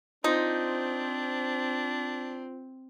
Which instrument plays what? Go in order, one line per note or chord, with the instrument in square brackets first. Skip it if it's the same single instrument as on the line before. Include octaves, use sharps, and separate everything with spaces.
[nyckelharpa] C4 [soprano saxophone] D4 [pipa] D#4 [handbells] F4 C5